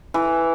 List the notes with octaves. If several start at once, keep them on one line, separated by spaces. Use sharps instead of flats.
E3